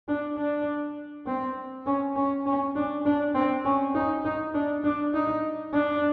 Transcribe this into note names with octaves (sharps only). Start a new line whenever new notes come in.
D4
D4
C4
C#4
C#4
C#4
D4
D4
C4
C#4
D#4
D#4
D4
D4
D#4
D4